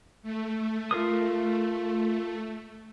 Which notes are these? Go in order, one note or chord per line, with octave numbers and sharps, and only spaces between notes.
A3
F4 A#4 D#6